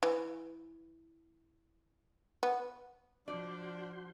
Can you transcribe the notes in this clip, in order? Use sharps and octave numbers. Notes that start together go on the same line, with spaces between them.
E3
B3
F3 D4 F#4 D5 C6 G6